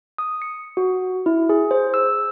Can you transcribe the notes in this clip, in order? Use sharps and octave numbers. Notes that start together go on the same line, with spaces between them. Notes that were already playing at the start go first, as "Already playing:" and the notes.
D#6
C#7
F#4
E4
G#4
C5
E6